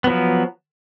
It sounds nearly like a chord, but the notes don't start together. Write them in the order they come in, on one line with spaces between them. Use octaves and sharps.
B3 F#3 F3